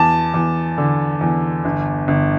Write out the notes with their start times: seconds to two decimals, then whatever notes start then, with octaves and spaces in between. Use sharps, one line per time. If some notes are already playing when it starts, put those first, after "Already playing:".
Already playing: E2 A5
0.34 E2
0.78 D3
1.21 E2
1.65 G1
2.08 G1